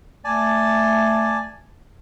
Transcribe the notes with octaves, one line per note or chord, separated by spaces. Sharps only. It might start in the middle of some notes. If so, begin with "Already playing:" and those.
A3 D5 G#5 A5